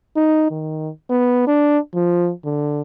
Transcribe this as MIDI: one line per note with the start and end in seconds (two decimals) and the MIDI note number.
0.16 0.47 63
0.51 0.89 51
1.10 1.45 59
1.47 1.78 62
1.95 2.31 53
2.45 2.82 50